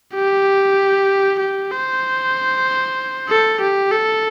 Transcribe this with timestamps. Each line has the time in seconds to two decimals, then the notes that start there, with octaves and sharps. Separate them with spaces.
0.15 G4
1.39 G4
1.71 C5
3.29 A4
3.60 G4
3.91 A4